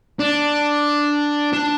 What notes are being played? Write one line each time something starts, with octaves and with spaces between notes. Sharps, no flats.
D4
D4